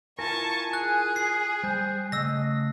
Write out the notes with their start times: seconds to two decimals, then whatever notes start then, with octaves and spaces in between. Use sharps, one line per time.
0.19 E4 F4 A#4 G#5 A5 C#6
0.73 G#4 F#6
1.16 C7
1.63 G3 C5
2.12 C#3 A3 D#5 E6 A#6